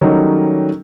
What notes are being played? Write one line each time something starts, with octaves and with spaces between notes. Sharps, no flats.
D#3 F#3 G3 A3 C#4 D#4